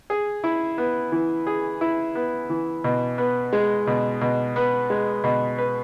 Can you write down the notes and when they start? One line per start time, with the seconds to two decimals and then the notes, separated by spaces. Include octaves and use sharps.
0.10 G#4
0.44 E4
0.78 B3
1.12 E3
1.47 G#4
1.81 E4
2.15 B3
2.50 E3
2.84 B2
3.18 B3
3.53 G#3
3.87 B2
4.21 B2
4.56 B3
4.90 G#3
5.24 B2
5.58 B4